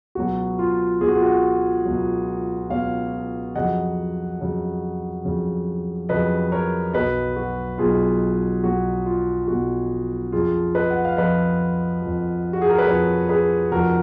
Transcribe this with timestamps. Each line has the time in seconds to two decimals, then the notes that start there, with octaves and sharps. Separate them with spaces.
0.15 C#2 B2 F#3 F#4
0.59 F4
1.01 C#2 B2 F#3 G#4
1.08 F#4
1.15 F4
1.22 F#4
1.85 C#2 B2 F#3
2.70 C#2 B2 F#3 C#5 F5
3.55 F2 C#3 F#3 D#5 F#5
4.39 F2 C#3 F#3
5.25 F2 C#3 F#3
6.09 F2 C#3 F#3 B4 D#5
6.52 A#4 C#5
6.93 B1 B2 F#3 B4 D#5
7.36 F#4
7.78 B1 B2 F#3 F4 G#4
8.63 B1 B2 F#3 F#4
9.06 F4
9.48 B1 B2 F#3 F#4
10.32 F2 F3 F4 G#4
10.75 B4 D#5
10.90 F#5
11.05 F5
11.17 F2 F3 B4 D#5
12.02 F2 F3
12.53 F#4
12.62 G#4
12.70 A#4
12.78 B4
12.87 F2 F3 A#4 C#5
13.29 G#4 B4
13.72 F1 F2 F3 F#4 A#4